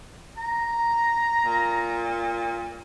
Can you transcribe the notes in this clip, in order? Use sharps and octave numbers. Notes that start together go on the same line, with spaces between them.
A#5
A#2